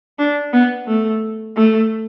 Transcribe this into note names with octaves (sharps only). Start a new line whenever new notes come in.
D4
B3
A3
A3